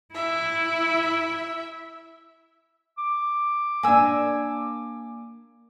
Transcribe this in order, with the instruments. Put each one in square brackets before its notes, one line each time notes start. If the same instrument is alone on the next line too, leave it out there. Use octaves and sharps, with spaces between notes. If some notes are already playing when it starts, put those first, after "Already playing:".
[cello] E4 [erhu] E5
[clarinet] D6
[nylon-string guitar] A#3 D4 [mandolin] G#5 E6